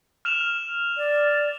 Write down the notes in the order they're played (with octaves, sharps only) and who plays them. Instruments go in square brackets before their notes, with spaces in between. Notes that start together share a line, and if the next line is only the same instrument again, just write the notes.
[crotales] F6 E7 F7
[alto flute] D5